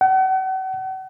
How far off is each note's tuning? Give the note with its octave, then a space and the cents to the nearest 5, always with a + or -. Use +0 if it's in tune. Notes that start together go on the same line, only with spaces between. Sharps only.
F#5 +40